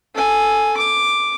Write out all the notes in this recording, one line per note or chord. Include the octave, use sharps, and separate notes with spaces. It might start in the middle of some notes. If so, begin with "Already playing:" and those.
A4 G#5
D6